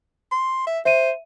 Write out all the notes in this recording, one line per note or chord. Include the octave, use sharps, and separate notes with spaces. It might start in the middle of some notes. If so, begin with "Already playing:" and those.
C6
E5
C5 E5 D#7